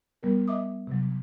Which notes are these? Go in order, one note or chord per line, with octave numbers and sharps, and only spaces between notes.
G3 B3 A#4
D#5 E5 D6 D#6
C3 F#3